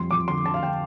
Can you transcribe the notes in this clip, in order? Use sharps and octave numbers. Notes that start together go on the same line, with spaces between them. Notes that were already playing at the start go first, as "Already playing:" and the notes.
Already playing: F2 G3 C6
F2 D6
D3 C6
D3 A5
F5
D3 G5